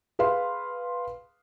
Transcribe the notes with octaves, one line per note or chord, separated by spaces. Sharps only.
G#4 B4 F5 C6